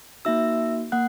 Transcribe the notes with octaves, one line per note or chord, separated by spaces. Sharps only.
A#3 D#4 F#4 E5 E6
A#3 F#5 F#6